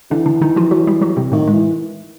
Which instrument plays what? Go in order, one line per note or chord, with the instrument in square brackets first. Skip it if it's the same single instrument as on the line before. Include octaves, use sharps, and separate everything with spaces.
[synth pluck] D3 D4 [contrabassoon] E3
[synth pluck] D3 D4
D#3 D#4
F3 F4
F#3 F#4
G3 G4
F#3 F#4
C3 C4
[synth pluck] A2 A3 [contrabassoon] D#3
[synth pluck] G#3
[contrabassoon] E3